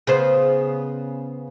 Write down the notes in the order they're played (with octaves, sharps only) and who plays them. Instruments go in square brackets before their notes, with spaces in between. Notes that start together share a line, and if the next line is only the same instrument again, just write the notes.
[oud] C#3 B3 C5